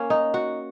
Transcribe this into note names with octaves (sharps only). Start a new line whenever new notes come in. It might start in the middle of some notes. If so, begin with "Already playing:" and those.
Already playing: A#3 C#4
D#4
F#4